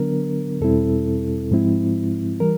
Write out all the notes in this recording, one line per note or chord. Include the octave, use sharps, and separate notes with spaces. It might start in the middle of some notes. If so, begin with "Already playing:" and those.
Already playing: D3 F#3 B3 D4 A#4
E2 B2 G3 C4 E4 A4
G#2 F3 G#3 C4 E4
E3 G3 A#4